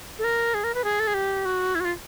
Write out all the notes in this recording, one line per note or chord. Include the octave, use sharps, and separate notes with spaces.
A4
A#4
G#4
A#4
B4
G#4
A4
G#4
G4
F#4
E4
F#4
F4